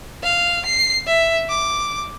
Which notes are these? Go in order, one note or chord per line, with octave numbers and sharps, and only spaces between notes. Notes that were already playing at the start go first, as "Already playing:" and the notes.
F5
C7
E5
D6